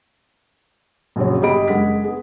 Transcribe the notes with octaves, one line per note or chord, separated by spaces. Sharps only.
A#1 F#2 C#3 F#3 C#5
G1 G4 G#4 D#5 B5 D7
F#1 G#3 G#4 F#5 B6
B3 G#4